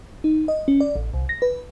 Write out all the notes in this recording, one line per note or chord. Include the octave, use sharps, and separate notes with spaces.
D#4
D#5
C#4
D5
A1
C2
A#6
B4